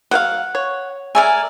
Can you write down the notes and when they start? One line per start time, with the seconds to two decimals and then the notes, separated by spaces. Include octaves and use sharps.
0.11 F#3 C5 F5 F#5
0.55 C#5
1.15 A#4 D5 E5 G#5